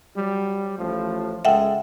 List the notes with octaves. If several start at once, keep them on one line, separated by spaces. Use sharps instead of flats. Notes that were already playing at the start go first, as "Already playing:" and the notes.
F#3 G3
A1 A2 F3
C#2 G#3 A4 E5 F#5 G5